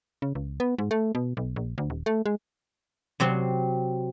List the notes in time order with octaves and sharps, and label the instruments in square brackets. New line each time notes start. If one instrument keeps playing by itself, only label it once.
[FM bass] C#3
C#2
B3
G#2
A3
B2
B1
A#1
D2
D#1
A3
G#3
[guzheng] C3 F#3 C4